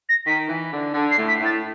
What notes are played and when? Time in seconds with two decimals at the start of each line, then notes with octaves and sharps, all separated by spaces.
0.09 A#6
0.26 D#3 B6
0.49 E3
0.72 D3
0.94 D3
1.11 C7
1.17 A2
1.28 B6
1.40 A2
1.45 A6